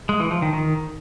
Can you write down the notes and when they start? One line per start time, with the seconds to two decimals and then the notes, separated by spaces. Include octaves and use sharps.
0.09 G#3
0.20 E3
0.31 F3
0.42 D#3
0.53 D#3